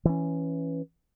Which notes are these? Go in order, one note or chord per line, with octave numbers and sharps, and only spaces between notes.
E3 C#4